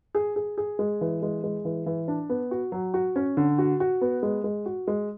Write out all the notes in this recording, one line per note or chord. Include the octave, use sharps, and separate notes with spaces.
G#4
G#4
G#4
G#3
E3
G#3
G#3
E3
E3
D4
B3
F#4
F#3
F#4
C#4
D3
F#4
F#4
B3
G#3
G#3
F#4
G#3